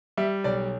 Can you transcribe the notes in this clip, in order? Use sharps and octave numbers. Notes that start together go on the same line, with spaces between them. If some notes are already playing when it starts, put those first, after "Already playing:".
G3 E5
B1 D5